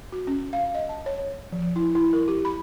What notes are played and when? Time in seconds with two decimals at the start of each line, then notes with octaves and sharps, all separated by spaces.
0.12 F#4
0.27 C#4
0.53 F5
0.75 D#5
0.89 A5
1.06 C#5
1.52 F3
1.76 E4
1.95 E4
2.13 A#4
2.28 G4
2.45 B5